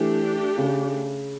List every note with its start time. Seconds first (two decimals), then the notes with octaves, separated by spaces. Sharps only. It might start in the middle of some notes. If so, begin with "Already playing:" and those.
Already playing: E3 A3 D4 G4
0.58 C#3